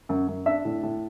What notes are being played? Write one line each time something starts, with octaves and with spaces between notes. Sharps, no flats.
F#2
F#2
D4 E5
A2
A2